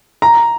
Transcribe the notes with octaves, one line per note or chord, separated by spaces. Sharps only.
A#5